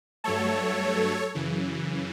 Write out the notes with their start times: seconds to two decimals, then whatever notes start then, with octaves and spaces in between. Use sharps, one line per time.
0.24 G2 F#3 A3 A4 C#5
1.35 F#2 C#3 E3